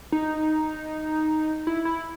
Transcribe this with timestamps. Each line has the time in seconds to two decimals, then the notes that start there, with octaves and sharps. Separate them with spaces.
0.12 D#4
1.67 E4
1.85 E4